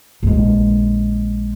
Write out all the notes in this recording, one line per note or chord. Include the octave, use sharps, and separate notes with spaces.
A#1 G#3